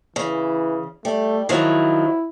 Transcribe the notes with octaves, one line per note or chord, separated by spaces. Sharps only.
C#3 E3
G3 A3
D#3 F3 F#3 E4